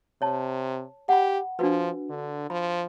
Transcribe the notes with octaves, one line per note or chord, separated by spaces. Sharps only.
C3 C#5 A5
G4 F#5 B5
F3 D4 F#4 B4
D3
F3 B5